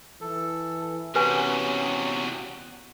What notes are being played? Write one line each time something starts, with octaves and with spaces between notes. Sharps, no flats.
E3 A4
E2 C3 C#4 F#4 G4 B4 G#5